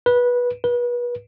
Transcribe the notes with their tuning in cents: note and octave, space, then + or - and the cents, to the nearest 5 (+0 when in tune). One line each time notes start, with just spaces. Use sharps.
B4 -20
B4 -35